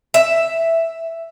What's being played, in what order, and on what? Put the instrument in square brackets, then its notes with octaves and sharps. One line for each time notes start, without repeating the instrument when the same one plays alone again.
[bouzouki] E5